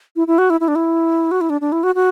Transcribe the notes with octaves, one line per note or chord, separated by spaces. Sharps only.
E4
E4
F#4
E4
E4
D4
E4
F#4
E4
D4
D4
E4
F#4
F#4